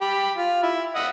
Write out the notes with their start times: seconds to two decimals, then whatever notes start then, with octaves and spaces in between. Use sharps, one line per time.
0.02 G4 B5
0.37 F4
0.63 E4
0.95 D#5 E5 F#5